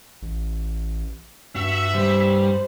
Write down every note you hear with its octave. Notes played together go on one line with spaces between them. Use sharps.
A1
G2 F#4 E5
G3 C5